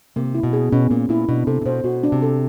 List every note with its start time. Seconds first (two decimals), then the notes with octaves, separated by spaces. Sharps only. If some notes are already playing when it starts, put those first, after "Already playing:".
0.16 C3 A#3
0.35 E4
0.43 B2
0.53 G#4
0.72 B2 C#4
0.91 A#2 A#3
1.09 A#2 E4
1.28 B2 D4
1.47 C3 A4
1.62 C3
1.66 B2 C5
1.84 B2 F#4
2.03 D4
2.12 C3
2.23 A4